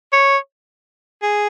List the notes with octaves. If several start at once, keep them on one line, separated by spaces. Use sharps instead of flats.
C#5
G#4